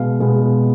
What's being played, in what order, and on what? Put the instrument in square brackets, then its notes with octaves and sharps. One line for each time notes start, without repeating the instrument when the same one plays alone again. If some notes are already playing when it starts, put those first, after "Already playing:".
Already playing: [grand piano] B2 G#3 B3 F5
B2 G#3 B3